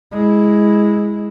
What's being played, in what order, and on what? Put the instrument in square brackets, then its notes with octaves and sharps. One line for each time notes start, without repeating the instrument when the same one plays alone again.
[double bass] G#3 E4